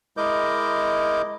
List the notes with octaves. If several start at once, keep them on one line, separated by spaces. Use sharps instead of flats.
G#3 E4 A#4 D#5 D6 G6